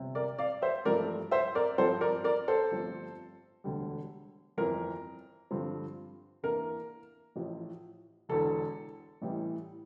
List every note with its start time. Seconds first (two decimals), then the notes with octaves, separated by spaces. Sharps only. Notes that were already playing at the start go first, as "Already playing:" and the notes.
Already playing: G1 C3
0.15 A#4 D5
0.38 D5 F5
0.62 C5 E5
0.85 A1 G2 F3 A3 A#4 D5
1.31 C5 E5
1.55 A#4 D5
1.78 G2 F3 C4 A4 C5
2.01 A#4 D5
2.24 A#4 D5
2.48 A4 C5
2.71 G1 G2 F3 A3 C4
3.64 E1 D2 D3 G3
4.57 G1 F2 E3 A#4
5.51 G2 D3 F3 C4
6.43 E2 E3 A#3 D4 A#4
7.36 A1 A2 F3
8.29 E1 E2 D3 A4
9.22 A1 A2 E3 G3